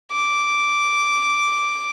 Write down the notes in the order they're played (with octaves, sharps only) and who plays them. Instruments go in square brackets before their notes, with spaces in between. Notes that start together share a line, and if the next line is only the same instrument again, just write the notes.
[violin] D6